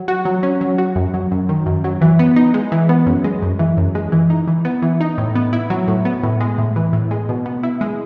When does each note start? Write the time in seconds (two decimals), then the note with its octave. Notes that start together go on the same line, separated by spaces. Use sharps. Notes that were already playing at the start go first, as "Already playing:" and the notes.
Already playing: F#3
0.08 F#4
0.25 F#3
0.43 C#4
0.61 F#3
0.78 F#4
0.96 F#2
1.14 F#3
1.32 F#2
1.49 D#3
1.66 F#2
1.84 F#3
2.01 E3
2.19 B3
2.36 D#4
2.54 G#3
2.72 E3
2.89 B3
3.07 F#2
3.24 G#3
3.42 F#2
3.59 E3
3.77 F#2
3.95 G#3
4.12 E3
4.30 D#4
4.48 E3
4.65 B3
4.82 E3
5.01 D#4
5.18 A2
5.35 B3
5.53 E4
5.70 F#3
5.88 A2
6.05 B3
6.23 A2
6.41 G#3
6.58 A2
6.76 E3
6.93 A2
7.11 G#3
7.29 B2
7.46 B3
7.63 E4
7.81 G#3